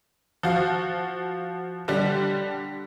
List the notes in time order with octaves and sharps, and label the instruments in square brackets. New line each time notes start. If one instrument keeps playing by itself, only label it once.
[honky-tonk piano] F3 F#4 F5
D3 G3 D4